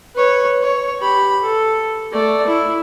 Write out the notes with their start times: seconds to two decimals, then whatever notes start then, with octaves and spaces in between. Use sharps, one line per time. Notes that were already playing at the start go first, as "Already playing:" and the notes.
0.15 B4 C#5
0.63 C#5
1.00 G4 B5
1.42 A4
2.12 A3 D5
2.47 E4